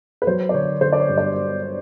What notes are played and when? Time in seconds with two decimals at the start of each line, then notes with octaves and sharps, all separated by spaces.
0.22 B4
0.27 F#3 C5
0.49 D5
0.54 D3 C#5
0.81 D3 C5
0.93 D5
1.00 C#5
1.09 G2
1.18 D5